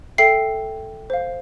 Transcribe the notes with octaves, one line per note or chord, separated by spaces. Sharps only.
A4 E5 G5 C7
C5 F5